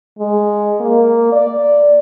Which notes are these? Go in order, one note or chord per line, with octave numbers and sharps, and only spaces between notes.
G#3
A#3
D5